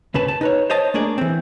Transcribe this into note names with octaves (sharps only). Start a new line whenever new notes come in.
C#2 C#3 B4 A5
A5
D#4 B4 C#5
C5 C#5 D#5 A5
A3 A#3 D4 G#4 D5
E3 C4